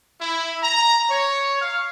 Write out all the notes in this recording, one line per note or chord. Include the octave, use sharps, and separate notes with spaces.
E4
A#5
C#5
F5